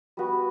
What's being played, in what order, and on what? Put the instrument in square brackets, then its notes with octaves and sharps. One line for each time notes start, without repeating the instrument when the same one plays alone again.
[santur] G3 B3 F#4 B4